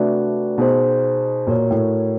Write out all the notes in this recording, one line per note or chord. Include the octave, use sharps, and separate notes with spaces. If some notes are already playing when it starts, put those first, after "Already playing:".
Already playing: C3 A3 D4 F#4 B4 D5
B2 D#4 G#4 C5
A#2 F#4 A#4 C#5
A2